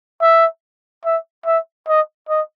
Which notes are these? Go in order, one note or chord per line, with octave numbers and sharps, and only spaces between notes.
E5
E5
E5
D#5
D#5